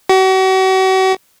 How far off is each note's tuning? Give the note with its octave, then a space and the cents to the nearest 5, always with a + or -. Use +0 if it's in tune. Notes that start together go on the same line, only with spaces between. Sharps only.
F#4 +40